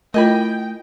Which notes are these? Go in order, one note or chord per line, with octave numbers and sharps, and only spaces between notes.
A3 E4 F4 A#4 D#5 G5 G#5 B5